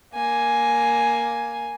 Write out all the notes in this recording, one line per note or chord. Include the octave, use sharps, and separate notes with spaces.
A#3 G#5